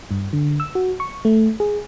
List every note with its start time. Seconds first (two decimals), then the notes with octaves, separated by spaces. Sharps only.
0.11 G2
0.33 D3
0.60 E6
0.75 F#4
1.00 C#6
1.25 A3
1.60 G#4